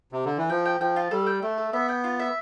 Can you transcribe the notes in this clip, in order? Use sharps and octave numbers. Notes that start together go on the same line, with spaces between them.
C3
D3
E3
F3 G5
G5
F3 G5
F4
G3 A4
G5
A3 A4
A4
B3 E5
G5
F4
E5